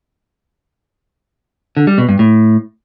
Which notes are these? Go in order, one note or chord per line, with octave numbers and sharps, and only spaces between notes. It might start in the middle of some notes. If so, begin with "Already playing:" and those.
D3
G3
B2
G2
A2